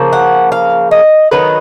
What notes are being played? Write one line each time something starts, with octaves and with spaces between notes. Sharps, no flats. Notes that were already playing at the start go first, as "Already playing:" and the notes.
Already playing: C#3 F3 A#3
F#5
F5
D#5
D#3 F#3 B3 D#4 B4